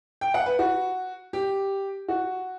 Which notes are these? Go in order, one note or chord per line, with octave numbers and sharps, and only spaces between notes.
G5
F#5
B4
F#4
G4
F#4